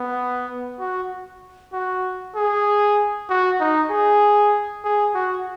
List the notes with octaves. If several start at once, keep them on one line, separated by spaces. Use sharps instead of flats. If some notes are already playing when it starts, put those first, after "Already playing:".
Already playing: B3
F#4
F#4
G#4
F#4
D#4
G#4
G#4
F#4